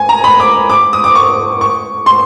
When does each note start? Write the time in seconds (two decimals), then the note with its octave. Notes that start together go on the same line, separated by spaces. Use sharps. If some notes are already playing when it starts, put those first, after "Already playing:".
Already playing: G#5
0.09 A#5
0.24 B5
0.40 D6
0.70 D6
0.93 D#6
1.04 D6
1.15 C#6
1.61 C#6
2.06 C6